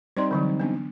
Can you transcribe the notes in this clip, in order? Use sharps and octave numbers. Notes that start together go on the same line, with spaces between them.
G3 C4 D#4 C5 D5 C6
D3 E3 F#3
B3 D4